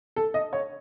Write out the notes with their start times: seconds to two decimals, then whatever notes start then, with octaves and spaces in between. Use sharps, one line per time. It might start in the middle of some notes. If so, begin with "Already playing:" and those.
0.16 A4
0.34 D#5
0.53 C#5